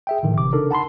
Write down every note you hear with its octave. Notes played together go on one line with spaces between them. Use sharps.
G#4 E5 G5
A2 D3 D#3 F3
G1 C3 E3 D6
C#3 D4 D#4 A4 A#4
F#5 A5 B5 C6